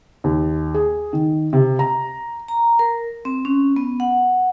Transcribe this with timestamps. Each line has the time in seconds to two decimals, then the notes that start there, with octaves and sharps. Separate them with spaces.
0.24 D#2
0.74 G#4
1.13 D#3
1.53 C3
1.79 A#5
2.48 A#5
2.79 A#4
3.25 C4
3.45 C#4
3.76 B3
4.00 F#5